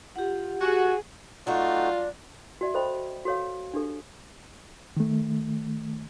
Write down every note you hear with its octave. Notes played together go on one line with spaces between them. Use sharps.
F4 G4 F#5
F#4 G#4 G#5
F#3 A3 D4 D#4 F4 F#4
F#4 D5 E5
A4 C5 D#5 G5 B5
F#4 A4 C#5 F5
D4 G4 A4
D#3 A3